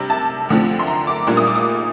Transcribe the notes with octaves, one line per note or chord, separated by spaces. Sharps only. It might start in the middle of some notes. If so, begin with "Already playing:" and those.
Already playing: C3 G3 D4
A5
D2 D3 F3 C4
C6
A#5
D6
A#2 G3 D4
D#6
D6
D#6